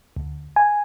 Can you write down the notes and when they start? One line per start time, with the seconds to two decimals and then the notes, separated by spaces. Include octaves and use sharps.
0.16 D2
0.56 G#5